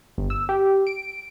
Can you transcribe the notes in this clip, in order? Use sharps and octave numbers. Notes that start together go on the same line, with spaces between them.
G1
E6
G4
D7